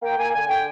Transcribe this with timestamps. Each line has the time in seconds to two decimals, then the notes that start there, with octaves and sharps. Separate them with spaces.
0.01 A#3 G5
0.18 A#3 G#5
0.33 D3 G#5
0.49 D3 G5